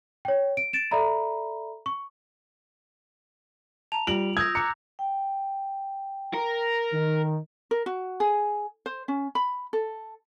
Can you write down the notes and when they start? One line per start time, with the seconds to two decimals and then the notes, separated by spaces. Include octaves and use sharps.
0.25 C#5 G5
0.57 D7
0.73 A6 D7 E7
0.91 A4 D5 E5 A#5 B5
1.86 C#6
3.92 A5 A#5 F7
4.07 G3 F4 D7 F#7
4.37 D#6 E6 G6 G#6 A#6
4.55 A#5 D6 F#6 C#7
4.99 G5
6.34 A#4
6.93 D#3
7.71 A#4
7.86 F#4
8.20 G#4
8.86 C5
9.08 C#4
9.35 B5
9.73 A4